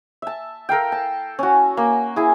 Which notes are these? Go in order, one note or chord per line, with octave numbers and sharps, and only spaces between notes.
E5 A5
A4 A#4 F5 G5
A5
C#4 F#4
A#3
E4 G#4